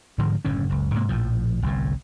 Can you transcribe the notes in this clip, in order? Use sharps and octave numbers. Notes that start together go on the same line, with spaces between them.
G#2 D3 D#3 F3
F#1 A2 D3 C#4
F#1 C#2
G#2 C3 A#3
A#1 A2 F3
G1 C2 A2